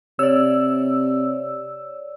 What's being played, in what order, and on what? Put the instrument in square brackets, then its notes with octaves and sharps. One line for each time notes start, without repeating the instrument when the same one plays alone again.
[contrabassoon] C3 [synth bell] C#5 D5 [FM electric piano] E6